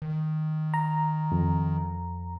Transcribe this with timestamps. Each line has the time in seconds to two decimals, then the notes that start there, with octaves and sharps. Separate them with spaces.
0.02 D#3
0.74 A#5
1.32 F2